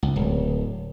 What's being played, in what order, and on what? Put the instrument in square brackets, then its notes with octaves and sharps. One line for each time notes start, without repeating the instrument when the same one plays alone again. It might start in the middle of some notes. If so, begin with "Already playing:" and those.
[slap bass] C#2
D1